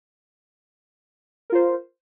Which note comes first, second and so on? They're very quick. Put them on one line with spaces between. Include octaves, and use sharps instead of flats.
A#4 F4 C5